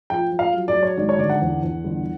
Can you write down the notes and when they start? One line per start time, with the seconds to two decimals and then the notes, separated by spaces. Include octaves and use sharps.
0.10 F3 G5
0.32 F3
0.39 F5
0.53 F#3
0.68 D5
0.76 F#3
0.83 C#5
0.98 G#1 D5
1.09 C#5
1.19 D3 D5
1.30 F#5
1.42 E2
1.63 E2
1.84 G1